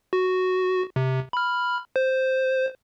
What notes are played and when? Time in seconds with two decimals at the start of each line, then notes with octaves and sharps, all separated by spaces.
0.13 F#4
0.96 C3
1.33 B5 F6
1.96 C5